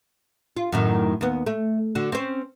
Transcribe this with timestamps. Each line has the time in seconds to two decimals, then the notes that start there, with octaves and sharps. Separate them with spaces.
0.57 F4
0.72 F#2 A2 D#3
1.21 D#2 B3
1.46 A3
1.95 D3 F#4
2.12 C4 C#4 C5